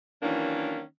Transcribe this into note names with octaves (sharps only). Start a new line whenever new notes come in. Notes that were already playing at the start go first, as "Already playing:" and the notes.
D#3 E3 F#3 A#3 C#4 D4